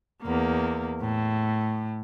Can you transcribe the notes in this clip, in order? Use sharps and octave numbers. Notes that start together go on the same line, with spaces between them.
E2 A#3
A2